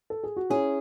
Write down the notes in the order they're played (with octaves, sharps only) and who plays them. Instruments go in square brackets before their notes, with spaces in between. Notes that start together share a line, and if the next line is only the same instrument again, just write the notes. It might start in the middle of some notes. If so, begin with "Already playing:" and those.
[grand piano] A4
G#4
F#4
[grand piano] C#4 E4 [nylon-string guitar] G#4